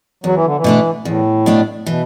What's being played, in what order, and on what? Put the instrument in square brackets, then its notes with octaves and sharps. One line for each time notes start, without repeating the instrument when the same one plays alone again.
[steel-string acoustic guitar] E2 [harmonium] F#3
[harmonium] E3
D3
E3
[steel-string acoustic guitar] B2 A3 D4
[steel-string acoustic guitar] E2 [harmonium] A2
[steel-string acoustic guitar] B2 A3 D4
[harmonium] B2 [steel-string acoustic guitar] E3